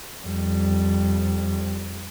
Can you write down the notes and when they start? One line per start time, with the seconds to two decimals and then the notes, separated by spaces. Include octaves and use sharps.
0.24 F2 G3